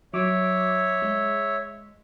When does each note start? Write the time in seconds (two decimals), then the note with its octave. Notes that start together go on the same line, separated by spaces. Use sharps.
0.14 F#3 C#5 E5 D6
1.02 G#3